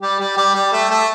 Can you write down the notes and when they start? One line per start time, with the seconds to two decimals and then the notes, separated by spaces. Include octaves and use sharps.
0.02 G3 G4
0.19 G3 G4
0.37 G3 G4
0.54 G3 G4
0.72 A3 A4
0.89 A3 A4